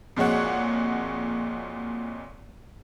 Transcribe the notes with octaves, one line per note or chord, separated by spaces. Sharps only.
F2 A#2 G#3 F#4 C#5 F#5